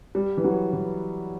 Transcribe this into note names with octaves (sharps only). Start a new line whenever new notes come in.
G3
E3
F#3
E3